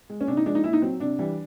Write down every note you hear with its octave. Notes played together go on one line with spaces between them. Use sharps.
G#3
C#4
C3 D4
D#4
F3 G#3 D4
D#4
A#2 E4
D#4
F#3 C4
C3 D4
E3 G3